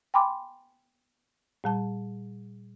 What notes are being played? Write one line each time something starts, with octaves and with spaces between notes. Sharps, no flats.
G5 G#5 B5 C6 D6
A#2 G3 A5